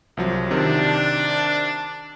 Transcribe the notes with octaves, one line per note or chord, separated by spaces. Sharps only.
C2 F3 F#3
C3 D#3 D4